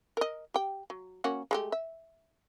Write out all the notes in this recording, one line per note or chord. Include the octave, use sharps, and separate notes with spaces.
A#4 D#5
G4 G5
F#3
A#3 C#4 F#4
G#3 A3 G4
E5